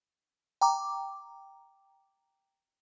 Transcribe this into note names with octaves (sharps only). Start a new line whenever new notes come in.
G5 A#5 D6